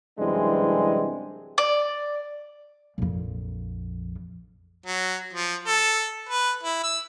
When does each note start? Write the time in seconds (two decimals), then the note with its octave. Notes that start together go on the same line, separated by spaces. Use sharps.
0.19 C2 F#2 E3 G#3 C4 D4
1.58 D5
2.98 A#1 F2
4.86 F#3
5.33 F3
5.67 A4
6.29 B4
6.63 E4
6.84 E6